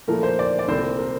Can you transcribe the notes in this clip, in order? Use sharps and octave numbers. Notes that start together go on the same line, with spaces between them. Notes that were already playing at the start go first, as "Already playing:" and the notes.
A#2 F3 A3 A#4
C5
D5
D5
C2 A#2 A3 C4 C5
A#4